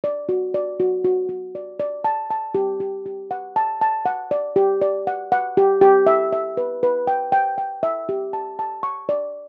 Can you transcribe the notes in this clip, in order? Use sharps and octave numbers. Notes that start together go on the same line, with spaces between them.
D5
F#4
D5
F#4
F#4
F#4
D5
D5
A5
A5
G4
G4
G4
F#5
A5
A5
F#5
D5
G4
D5
F#5
F#5
G4
G4
E5
E5
B4
B4
G5
G5
G5
E5
G4
A5
A5
C#6
D5